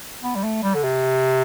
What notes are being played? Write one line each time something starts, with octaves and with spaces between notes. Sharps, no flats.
B3
G3
A3
G3
D3
C3